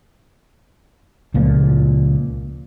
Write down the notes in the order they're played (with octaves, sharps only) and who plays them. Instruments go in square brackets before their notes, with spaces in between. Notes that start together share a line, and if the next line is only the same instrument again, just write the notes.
[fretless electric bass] C#2 A#2 F3